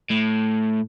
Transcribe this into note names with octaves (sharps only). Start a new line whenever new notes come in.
A2